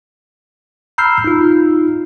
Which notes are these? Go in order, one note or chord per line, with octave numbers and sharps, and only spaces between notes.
A#5 B5 E6 F6 G6 C7
D#4 F4